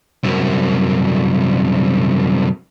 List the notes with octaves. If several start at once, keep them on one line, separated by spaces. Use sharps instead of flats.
C2 F#2